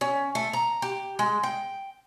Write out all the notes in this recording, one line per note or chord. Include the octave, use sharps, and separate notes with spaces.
C#4
A3
A#5
G4
G#3
G5